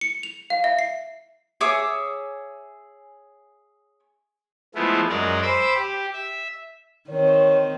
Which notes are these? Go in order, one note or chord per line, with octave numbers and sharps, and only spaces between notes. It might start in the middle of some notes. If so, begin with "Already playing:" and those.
C#7
F7
F5
E5
C7
G#4 C#5 E5 D6
F3 G#3 A3 B3 E4
F#2 G#3 A#4 D5
C5 B5 D6 E6
G4
E5
D#3 C4 C#5